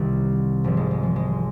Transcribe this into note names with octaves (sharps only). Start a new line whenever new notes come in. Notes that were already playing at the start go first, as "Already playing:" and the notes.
Already playing: C2 C3 D#3
G#1 G#2 D#3 F3
G#3
G#3
F3
G#3